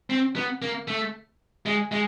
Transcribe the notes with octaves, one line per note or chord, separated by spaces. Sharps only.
C4
B3
A#3
A3
G#3
G#3